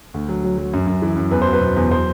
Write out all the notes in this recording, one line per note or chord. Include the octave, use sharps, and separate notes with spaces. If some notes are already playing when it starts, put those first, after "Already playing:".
D2
F#3
F#3
F#3
F#2
F#2
E3
F#2
E2 B4
F#3 C5
B4
B2
E2
F#3 C5